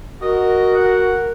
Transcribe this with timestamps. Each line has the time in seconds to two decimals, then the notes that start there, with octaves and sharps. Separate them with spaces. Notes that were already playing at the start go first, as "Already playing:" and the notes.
0.22 F#4 A#4 D#5
0.75 F#5